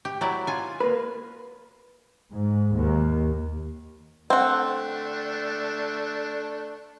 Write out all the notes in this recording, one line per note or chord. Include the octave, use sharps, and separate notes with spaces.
G4
F#3 E4 D5
F4 G#5
A#3 B4
G#2
D#2
A3 C4 D4 F#5